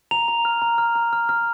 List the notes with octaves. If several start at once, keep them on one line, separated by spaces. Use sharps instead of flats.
A#5 F7
A#5
F6
A#5
F6
A#5
F6
F6